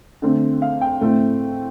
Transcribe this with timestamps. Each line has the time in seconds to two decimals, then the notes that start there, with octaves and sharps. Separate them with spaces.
0.22 D3 A3 C4
0.62 F5
0.81 G5
1.01 A2 A3 C4